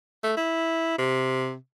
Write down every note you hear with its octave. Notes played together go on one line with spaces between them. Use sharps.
A3
E4
C3